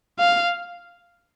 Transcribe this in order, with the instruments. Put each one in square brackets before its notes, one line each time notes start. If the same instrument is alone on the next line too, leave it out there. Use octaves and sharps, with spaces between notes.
[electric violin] F5